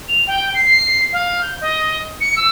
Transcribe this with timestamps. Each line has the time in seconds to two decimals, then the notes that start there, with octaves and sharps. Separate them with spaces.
0.09 F7
0.27 G5
0.54 C7
1.13 F5
1.41 G6
1.61 D#5
2.21 C#7
2.37 E6